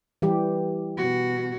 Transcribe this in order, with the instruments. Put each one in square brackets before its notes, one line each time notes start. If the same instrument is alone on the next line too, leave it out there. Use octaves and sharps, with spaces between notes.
[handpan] E3 G3 G4
[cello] B2 F#4